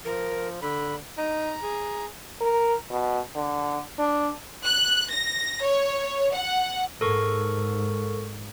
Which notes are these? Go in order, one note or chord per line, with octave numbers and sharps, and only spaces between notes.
F3 A#4
D3 B5
D#4 A#5
G#4
A#4
B2
D3
D4
F#6
A#6
C#5
F#5
G#2 A4 A#4 C#6